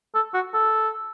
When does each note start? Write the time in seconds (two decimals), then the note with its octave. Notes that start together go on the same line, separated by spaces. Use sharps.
0.14 A4
0.34 F#4
0.53 A4